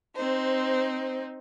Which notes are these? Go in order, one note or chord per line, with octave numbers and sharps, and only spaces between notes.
C4 D#4 C5